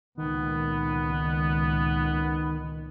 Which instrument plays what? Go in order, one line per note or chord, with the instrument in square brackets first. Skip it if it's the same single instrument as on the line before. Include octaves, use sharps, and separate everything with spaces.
[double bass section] C#2 A#2 [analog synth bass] D#3 [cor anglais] B3